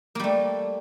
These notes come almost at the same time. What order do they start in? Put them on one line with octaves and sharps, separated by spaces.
A#3 G3 A3